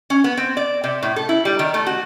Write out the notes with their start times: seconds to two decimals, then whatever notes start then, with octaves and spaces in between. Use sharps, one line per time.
0.10 C#4
0.24 B3
0.37 C4
0.57 D5
0.84 C3
1.03 A2
1.16 A4
1.29 E4
1.45 G3
1.59 D#3
1.74 A3
1.87 F#4